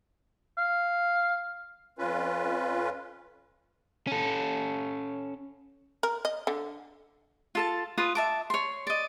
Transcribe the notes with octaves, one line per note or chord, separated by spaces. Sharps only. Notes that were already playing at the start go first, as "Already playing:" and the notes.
F5
F2 C#4 F4 B4
C#4 A4
A#4
D#5
D3
F4 A4 A5
F4 B4 D#6
E5 A5 D6
C#5 C6
D5 D#5